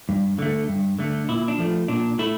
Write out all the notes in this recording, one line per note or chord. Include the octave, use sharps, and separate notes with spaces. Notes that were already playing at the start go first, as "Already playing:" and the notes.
G2
D3 A3
G2
D3 A3
A#2 E4
D4
F3 A3
A#2 D4
A3 E4